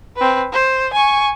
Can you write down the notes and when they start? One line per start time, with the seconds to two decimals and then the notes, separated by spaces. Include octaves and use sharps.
0.16 C4 B4
0.52 C5
0.93 G#5 C#6